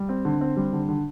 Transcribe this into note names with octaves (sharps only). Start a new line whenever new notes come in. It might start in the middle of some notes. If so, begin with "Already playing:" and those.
Already playing: G3
C4
D3
C4
G3
D3
D3